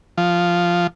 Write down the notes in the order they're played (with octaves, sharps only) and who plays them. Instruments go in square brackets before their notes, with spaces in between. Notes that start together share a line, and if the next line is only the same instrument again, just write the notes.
[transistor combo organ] F3